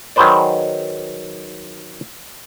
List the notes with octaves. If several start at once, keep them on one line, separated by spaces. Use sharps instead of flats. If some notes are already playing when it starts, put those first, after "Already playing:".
D#3 F#3 G#4 B4 C5 D5